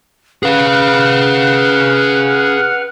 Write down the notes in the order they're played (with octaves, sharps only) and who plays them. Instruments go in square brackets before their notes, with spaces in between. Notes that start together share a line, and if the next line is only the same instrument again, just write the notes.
[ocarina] C#4 [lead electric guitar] G#4 F5 [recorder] B4 [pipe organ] F#5 F6